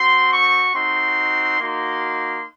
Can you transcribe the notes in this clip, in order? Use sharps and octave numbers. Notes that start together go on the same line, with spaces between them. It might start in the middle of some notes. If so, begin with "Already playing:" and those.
Already playing: C4 F#4 C6
C#6
C4 D#4 F#4 C6
A#3 D#4 F#4 C6